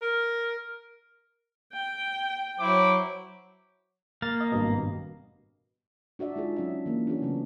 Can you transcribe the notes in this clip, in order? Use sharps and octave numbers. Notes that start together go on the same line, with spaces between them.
A#4
G5
F#3 E4 C5 D6
A#3 F6 A6
D#5
G#1 G2 B2
D4 F#4 D5 E5
G#3 D#4 F4 G#4
F#3 C#4 D4 E5
E3 A#3
C#4 D4 F#4 G#4
C#3 F#3 A3 B3